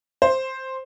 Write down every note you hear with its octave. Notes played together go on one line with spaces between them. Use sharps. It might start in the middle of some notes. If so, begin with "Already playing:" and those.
C5